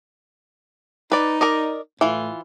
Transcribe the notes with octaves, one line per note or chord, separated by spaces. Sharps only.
D#4 B4 D5
A#4 D5 D#5
A2 E3 F4